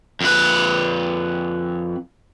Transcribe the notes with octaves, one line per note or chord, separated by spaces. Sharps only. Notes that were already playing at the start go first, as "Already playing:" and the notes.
F2 B4